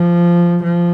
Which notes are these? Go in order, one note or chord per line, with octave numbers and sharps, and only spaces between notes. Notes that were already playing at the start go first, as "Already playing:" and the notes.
Already playing: F3
F3